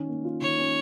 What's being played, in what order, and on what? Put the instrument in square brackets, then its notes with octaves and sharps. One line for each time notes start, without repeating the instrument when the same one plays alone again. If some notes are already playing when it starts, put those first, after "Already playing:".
Already playing: [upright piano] D#3 C#4
A#3
F4
[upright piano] D#3 [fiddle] C#5
[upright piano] C#4